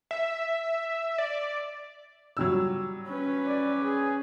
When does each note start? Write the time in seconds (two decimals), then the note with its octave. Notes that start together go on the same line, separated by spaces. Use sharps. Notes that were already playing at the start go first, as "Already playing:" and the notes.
0.11 E5
1.18 D5
2.37 F#3 G3 E6
3.07 C#4 B4
3.47 D5
3.82 G#4